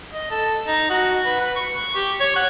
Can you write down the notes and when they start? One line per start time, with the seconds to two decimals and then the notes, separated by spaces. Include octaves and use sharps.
0.12 D#5
0.31 A4
0.67 D#4
0.90 F#4
1.25 B4
1.40 B4
1.56 C#6
1.96 G4
2.20 C#5
2.36 F#5